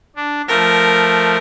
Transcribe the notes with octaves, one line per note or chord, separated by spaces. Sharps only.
D4
F3 A3 A#4